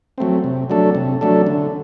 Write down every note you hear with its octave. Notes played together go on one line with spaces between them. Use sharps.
F#3 A3 C4
C3
F#3 A3 D4 A4
C3
F#3 A3 D4 A4
D3